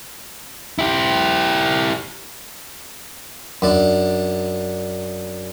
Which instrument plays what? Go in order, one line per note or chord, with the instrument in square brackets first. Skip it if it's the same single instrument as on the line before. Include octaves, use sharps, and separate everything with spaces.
[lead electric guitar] E4 G4
[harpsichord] F#2 D4